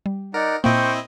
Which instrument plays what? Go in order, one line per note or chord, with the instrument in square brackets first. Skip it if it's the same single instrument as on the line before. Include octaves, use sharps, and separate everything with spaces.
[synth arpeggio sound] G3
[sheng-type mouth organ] D#4 D5 F#5 [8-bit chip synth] A#4
[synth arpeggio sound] A#2 A#3 [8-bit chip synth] C4 E4 D#5 [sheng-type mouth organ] C5 G5 C#6